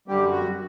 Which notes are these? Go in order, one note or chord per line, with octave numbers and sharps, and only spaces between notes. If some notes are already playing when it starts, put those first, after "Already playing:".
F#2 D3 G3 G4
F#4